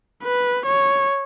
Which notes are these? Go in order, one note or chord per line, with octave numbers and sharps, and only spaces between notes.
B4
C#5